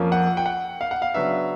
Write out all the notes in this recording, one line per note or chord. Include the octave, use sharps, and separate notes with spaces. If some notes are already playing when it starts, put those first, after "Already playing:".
Already playing: F2 F3 A#3 C#4
F#5
G5
F#5
F5
F#5
F5
C#3 F#3 B3 D4 E5